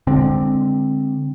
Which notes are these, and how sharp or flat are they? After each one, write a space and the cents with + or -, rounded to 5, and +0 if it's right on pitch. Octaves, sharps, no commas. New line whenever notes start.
D3 +0 G#3 -25 C4 +0